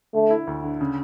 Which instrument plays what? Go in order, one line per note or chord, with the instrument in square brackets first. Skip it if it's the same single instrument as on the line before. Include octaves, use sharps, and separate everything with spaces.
[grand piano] D3 [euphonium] A3
[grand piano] E4
D2
D3
C#3